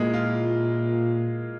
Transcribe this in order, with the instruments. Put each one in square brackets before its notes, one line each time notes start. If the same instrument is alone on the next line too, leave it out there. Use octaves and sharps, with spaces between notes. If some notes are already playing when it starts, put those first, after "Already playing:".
Already playing: [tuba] A#2 [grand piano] G#3 A#3 E4
[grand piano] F4